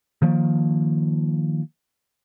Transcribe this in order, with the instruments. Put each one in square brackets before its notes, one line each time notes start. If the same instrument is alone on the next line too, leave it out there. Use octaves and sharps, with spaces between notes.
[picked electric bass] D#3 F3 A#3